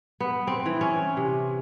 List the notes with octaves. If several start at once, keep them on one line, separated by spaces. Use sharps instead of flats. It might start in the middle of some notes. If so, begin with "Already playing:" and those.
B3
C4
E3
C#4
C3